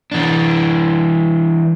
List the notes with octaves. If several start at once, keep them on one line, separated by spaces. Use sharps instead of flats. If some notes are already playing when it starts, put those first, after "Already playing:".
E3 D4